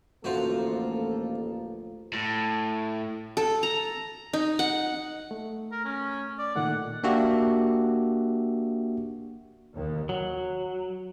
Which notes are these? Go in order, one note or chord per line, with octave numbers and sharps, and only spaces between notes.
A1 D2 F3 A3 A#3 F4 F#4 A4
A2
A4
A#5
D#4
F#5
A3
A#4
C#4
D5
A#2 D#3 A3 F#5
A#3 D4 F#4 G4 E5
D#2
F#3